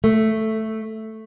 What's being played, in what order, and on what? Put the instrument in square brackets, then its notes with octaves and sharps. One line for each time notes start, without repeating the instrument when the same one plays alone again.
[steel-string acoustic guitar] A3